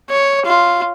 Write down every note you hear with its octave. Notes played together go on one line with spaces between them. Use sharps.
C#5
F4